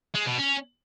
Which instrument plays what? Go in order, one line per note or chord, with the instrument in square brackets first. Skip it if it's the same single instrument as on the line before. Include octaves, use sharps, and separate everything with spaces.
[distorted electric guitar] G#3
B2
C#4